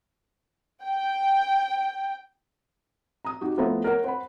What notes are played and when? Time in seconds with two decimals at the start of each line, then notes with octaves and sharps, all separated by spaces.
0.83 G5
3.25 A#5 D#6
3.41 D#4 F#4 G4
3.57 F3 A3 B3 E4 C5 A#5
3.84 A#4 C#5 F#5 A#5
4.04 C5 F#5 B5